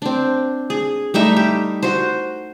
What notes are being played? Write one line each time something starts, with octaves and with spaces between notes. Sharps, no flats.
C4 D4
G#4
G3 A3 D#4 E5
G4
F#4 C5